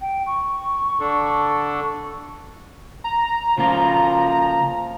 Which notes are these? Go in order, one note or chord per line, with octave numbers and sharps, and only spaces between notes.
G5
C#6
D3 D4 A4
A#5
C#3 F3 A#3 F4